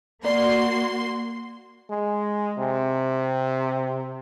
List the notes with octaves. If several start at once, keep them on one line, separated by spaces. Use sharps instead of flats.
A#3 F#4 D5 C6
G#3
C3